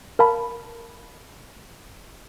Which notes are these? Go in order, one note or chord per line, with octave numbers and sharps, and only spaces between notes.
A#4 F5 A5 B5